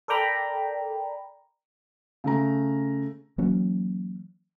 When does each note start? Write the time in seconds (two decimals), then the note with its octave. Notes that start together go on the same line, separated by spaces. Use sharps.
0.08 A4 A#4 D5 G5 A#5 B5
2.24 C#3 A3 A#5
3.38 E3 F#3 A#3 C#4